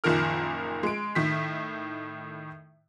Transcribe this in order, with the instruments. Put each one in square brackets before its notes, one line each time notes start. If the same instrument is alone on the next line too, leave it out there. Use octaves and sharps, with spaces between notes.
[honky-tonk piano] F#1 A#2 D#3 F3 A#4 F6
G#3 D7
A2 D#3 B6